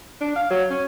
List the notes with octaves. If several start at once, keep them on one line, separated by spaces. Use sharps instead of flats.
D4
F5
F#3
C#4